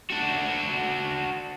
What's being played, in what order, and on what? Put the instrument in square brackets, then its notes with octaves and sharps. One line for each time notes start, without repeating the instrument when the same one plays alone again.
[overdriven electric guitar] D4 F#4